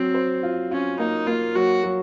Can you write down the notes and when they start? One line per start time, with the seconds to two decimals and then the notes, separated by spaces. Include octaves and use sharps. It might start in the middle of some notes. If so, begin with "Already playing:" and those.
Already playing: F#3 C4
0.14 C5
0.43 F4
0.71 C#4 F4
0.99 A#3 D#4
1.27 A#3 F4
1.55 F#3 F#4
1.84 F#3